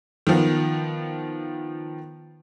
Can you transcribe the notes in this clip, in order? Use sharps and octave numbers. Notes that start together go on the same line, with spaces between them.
D#3 F3 B3